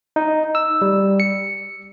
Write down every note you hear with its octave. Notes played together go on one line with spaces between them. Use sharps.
D#4
E6
G3
C#7